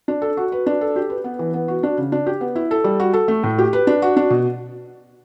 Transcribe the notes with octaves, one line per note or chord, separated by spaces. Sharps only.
D4
A4
F#4
B4
D4
A4
G4
B4
B3
E3
B3
F#4
D4
C#3
D4
G4
B3
E4
A4
G3
F#4
A4
A3
A2
G4
B4
D4
F#4
D4
B2